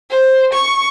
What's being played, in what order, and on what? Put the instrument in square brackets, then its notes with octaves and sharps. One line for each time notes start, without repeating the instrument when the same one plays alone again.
[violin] C5
C#6